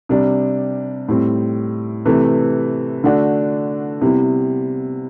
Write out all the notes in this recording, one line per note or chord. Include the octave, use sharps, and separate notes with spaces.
C3 G3 D4
A2 G3 C4
C3 E3 A3
D3 A3 D4 F#4
C3 G3 B3 E4